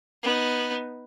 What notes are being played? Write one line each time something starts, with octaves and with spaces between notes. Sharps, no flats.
B3 D#4